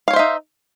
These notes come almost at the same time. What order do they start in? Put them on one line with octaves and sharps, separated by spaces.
F5 C#5 C5 E5 D#4